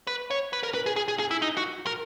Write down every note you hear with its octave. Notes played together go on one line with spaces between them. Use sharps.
B4
C#5
B4
A#4
B4
G#4
G#4
G#4
G#4
E4
D#4
F#4
A#4